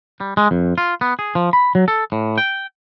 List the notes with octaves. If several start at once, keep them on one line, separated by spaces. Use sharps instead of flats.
G3
G#3
F2
F4
B3
G#4
F3
B5
F#3
A4
A2
G5